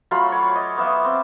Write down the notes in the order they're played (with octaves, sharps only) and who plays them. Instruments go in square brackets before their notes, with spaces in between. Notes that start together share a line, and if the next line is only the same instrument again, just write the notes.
[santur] F#3 A3 F4 B5
C#5 D6
D#5
B3 E5 F5 D6
C4